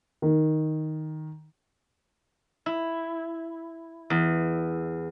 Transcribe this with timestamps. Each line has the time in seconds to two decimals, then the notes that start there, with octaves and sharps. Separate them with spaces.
0.22 D#3
2.66 E4
4.10 E2